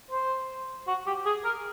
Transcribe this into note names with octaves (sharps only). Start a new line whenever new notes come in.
C5
F#4
G4
G#4
A#4